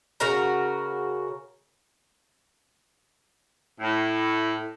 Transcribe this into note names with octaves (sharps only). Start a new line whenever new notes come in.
C#3 F#4 A#4 A#5
A2